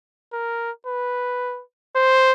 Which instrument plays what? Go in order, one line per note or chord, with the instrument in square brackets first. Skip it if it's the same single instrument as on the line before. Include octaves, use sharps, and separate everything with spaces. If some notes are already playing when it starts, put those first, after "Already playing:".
[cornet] A#4
B4
C5